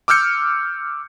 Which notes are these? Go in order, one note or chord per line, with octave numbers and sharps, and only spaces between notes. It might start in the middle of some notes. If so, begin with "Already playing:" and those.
D6 E6 F6 G6 C#7